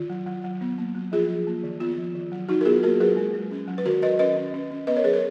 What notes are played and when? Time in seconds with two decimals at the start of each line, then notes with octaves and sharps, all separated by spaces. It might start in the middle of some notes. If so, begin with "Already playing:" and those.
Already playing: D#3 F4
0.10 F#3
0.26 F#3
0.44 F#3
0.61 B3
0.78 A#3
0.95 F#3
1.12 F3 F4 G#4
1.29 F3
1.47 A#3
1.64 D#3
1.80 B3 F4
1.97 F3
2.15 D#3
2.32 F#3
2.49 F#3 D#4 F#4
2.61 A#4
2.65 B3 F4 G#4
2.83 A#3 F#4 A#4
3.00 F#3 G#4 B4
3.17 G#3
3.34 G#3
3.51 C#4
3.68 F#3
3.78 B4
3.86 D#3 F#4 A#4
4.02 D#3 B4 D#5
4.19 C#4 B4 D#5
4.37 C#4
4.54 C#4
4.71 C#4
4.87 B3 B4 D#5
4.96 A#4 C#5
5.04 F#3 G#4 B4
5.13 A#4 C#5